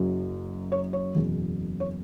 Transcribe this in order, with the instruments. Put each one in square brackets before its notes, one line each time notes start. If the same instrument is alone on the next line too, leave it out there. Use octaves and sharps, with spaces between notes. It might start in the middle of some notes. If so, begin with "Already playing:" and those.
Already playing: [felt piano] F#1 F#2 F#3
C#5
C#5
F#1 E2 B2
C#5